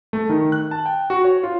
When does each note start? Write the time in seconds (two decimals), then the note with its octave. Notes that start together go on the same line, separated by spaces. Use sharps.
0.13 A3
0.29 D#3
0.52 F#6
0.71 A5
0.86 G5
1.10 F#4
1.24 C#5
1.43 F4